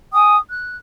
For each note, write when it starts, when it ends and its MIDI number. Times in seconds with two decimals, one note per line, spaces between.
0.12 0.35 79
0.12 0.35 80
0.12 0.35 87
0.49 0.76 90